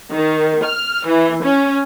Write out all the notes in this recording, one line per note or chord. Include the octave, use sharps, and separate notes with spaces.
D#3
F6
E3
C#4